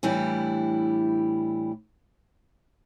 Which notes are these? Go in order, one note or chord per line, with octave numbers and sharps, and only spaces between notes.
A2 E3 G3 D4 E4 G4